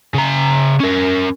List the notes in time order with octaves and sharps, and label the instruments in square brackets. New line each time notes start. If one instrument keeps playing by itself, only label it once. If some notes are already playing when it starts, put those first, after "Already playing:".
[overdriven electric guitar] C#3 A#5
C#4 A#4